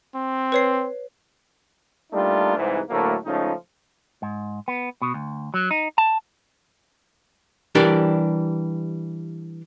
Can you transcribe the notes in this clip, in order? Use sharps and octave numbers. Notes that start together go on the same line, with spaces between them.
C4
B4 C#5 C7
G3 A3 A#3 D4 D#4 F4
C2 G#2 E3
D2 A2 F#3 A3 A#3
C#2 F3 A3 C#4 D#4
G#2
B3
B2
D2
F#3
D#4
A5
E3 G3 D4 G4 A#4